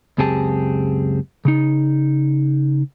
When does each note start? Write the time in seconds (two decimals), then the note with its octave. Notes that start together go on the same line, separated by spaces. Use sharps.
0.18 C#2 F#2 C4 G4 G#4 A5
1.45 C#3 D#4